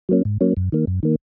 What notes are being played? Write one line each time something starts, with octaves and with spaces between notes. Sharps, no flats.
F#3 A#3 C#4
G#2
F#3 A#3 C#4
F#2
D#3 A#3
F#2
D#3 A#3